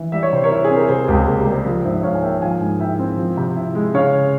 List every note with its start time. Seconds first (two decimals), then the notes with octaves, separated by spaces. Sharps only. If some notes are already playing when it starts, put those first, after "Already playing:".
Already playing: E3
0.12 G3 E5
0.23 C#5
0.32 C3 C5
0.44 A#4 C#5
0.51 E4
0.65 G#4
0.71 C4
0.76 A#4
0.89 C3 G#4 C5
1.08 C#2 G4 A#4
1.27 A#3 G#4
1.40 G4 A#4
1.46 G3
1.52 G#4 C5
1.66 F3
1.84 G#2 C5 E5
1.97 E5
2.03 G#2 C#5 F5
2.15 G#5
2.22 A#3 E5 G5
2.42 F3 F5 G#5
2.60 G#2
2.80 E4 E5 G5
2.99 C4
3.17 F3
3.37 C3
3.56 E4
3.75 G#3
3.94 C#3 C#5 F5